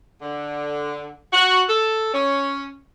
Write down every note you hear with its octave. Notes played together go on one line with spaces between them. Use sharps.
D3
F#4
A4
C#4